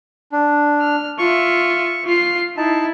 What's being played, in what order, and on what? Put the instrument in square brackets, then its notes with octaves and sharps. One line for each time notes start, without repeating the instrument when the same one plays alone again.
[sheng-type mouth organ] D4
[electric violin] F6
[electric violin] F4 E5 [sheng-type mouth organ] C#6
[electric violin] F4 C7
[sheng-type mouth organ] D#4 A5 [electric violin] E4